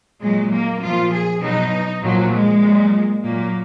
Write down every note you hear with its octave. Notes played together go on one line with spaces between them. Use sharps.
A#2 F#3 G#3
A#3
A#2 F3 F4
G#4
B2 F#3 D#4
A#2 F3 F#3
G#3
A#2 F#3
A#2 F#3 A#3